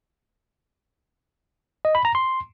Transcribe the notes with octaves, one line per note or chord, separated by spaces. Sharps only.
D#5
B5
A#5
C6